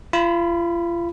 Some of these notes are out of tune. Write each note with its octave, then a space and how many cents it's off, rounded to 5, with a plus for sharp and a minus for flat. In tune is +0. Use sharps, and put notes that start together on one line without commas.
F4 -35 B5 +0